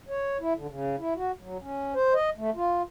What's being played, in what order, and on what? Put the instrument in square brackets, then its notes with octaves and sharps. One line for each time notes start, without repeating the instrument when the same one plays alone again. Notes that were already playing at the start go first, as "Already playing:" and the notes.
[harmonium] C#5
E4
D3
C#3
E4
F#4
F#3
C#4
C5
D#5
A3
F4